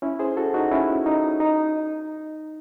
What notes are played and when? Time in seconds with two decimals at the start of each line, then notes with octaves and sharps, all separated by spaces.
0.02 C#4 E4
0.19 G#4 C5
0.37 F#4 A4
0.54 D#4 F#4
0.71 C#4 E4
1.06 D#4
1.40 D#4